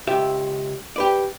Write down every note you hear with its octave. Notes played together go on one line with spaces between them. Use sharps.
C#2 G4 E5
G4 B4 D5